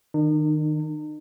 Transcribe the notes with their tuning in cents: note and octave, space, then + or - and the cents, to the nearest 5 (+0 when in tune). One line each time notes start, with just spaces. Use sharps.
D#3 -10 D#4 -45